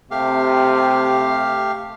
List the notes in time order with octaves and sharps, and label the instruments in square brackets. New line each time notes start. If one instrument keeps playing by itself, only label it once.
[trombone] C3 [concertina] A3 G4 F5